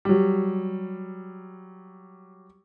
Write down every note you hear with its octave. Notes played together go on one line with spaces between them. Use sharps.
F#3 G3